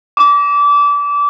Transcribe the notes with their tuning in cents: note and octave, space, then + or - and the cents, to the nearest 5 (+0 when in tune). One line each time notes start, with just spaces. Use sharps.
D6 -25